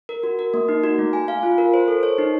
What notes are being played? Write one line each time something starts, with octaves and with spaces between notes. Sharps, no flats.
A#4
F#4
A#4
A#3
D#4
F#4
A3
G#5
F5
F4
A#4
C5
A4
C#5
D#4